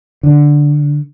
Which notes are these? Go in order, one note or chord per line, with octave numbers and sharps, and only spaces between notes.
D3